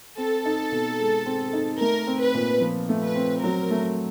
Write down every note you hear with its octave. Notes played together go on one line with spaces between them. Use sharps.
C4 A4
D#4
B2
G#3
C4
D#4
A3 A#4
C4
B4
A#2
F3
A3
B4
C4
F#3 A#4
A3